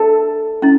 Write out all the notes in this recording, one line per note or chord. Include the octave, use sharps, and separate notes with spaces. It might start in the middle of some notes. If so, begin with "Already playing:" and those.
Already playing: A4
C#4 E4